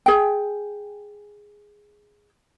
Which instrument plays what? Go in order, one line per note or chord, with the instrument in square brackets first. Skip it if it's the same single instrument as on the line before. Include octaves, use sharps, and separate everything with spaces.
[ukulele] G#4 G5